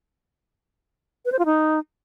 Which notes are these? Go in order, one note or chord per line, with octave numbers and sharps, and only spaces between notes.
B4
C5
F4
D#4